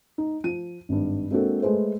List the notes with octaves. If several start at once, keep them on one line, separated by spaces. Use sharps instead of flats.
D#4
F3 D#7
G#1 G2
G#3 A#3 C4 D4 F#4 A4
G#3 A3 G#4 B4 C5